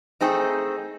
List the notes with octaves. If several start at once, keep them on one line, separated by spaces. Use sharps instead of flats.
A3 C4 D#4 G#4